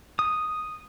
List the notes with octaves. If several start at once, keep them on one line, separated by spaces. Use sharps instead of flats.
D#6